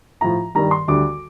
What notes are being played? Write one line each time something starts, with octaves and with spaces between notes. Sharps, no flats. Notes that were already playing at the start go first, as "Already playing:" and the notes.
A2 F3 A#5
G2 D#3 G3 A#5
C6
D2 D3 G3 D6